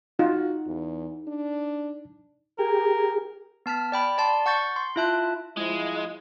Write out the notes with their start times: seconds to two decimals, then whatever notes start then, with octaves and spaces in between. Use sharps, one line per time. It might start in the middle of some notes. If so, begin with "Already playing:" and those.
0.19 D#4 F4 F#4
0.67 E2
1.28 D4
2.59 G4 G#4 A#4
3.66 B3 A5 F6 B6
3.92 D5 G5 B5
4.18 D5 A5 C6
4.46 F#5 C#6 G6 A6
4.76 C6
4.96 E4 F4 E5 A5 F#6
5.57 F3 G#3 E4